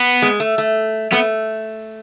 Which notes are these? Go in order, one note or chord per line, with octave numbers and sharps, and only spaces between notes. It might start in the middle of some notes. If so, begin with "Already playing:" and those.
Already playing: B3
G#3
A3
A3
A3 B3